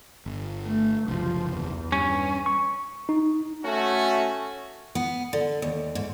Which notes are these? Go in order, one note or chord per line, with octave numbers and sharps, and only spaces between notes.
G1
A3
F#1 C2 F3
E2
G2 C#4
C#6
D#4
A3 C#4 F#4
B3
D3
D#2
G#2